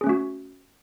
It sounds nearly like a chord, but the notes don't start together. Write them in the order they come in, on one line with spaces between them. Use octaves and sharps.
G#4 C#4 A3 F#4